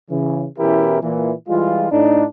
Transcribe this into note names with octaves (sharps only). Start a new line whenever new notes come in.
C#3 E3
B2 E3 C#4 E4 G4 A#4
A#2 E3
E3 G3 G#3 F4
A2 D4 D#4